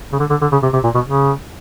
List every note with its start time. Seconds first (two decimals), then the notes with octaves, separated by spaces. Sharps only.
0.12 C#3
0.19 D3
0.30 D3
0.41 D3
0.52 C#3
0.62 C3
0.73 C3
0.83 A#2
0.94 B2
1.06 C#3